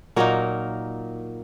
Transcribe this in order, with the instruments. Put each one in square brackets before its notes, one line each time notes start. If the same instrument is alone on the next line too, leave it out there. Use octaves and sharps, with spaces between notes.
[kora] A#2 F#3 A#3 D#4 A#4